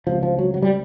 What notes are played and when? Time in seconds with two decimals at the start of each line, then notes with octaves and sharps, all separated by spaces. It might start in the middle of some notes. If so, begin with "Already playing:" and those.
0.07 C#2 C3 F3
0.23 F3
0.39 F#3
0.54 F#3
0.62 G3